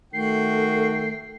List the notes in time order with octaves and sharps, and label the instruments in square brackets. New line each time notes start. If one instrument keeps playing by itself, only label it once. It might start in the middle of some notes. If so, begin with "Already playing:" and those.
[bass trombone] D#3 [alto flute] A3 [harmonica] F#4 G5 [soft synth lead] C7